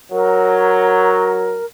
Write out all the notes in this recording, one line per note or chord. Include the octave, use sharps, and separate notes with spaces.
F#3 A#4